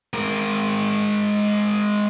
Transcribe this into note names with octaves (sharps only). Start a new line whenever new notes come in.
G#3 A#4